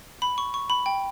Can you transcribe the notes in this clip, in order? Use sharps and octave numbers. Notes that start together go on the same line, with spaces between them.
B5
C#6
C#6
B5
G5